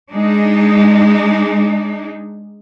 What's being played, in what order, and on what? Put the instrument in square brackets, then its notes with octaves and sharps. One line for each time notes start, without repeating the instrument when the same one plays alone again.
[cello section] G#3 D4 D#4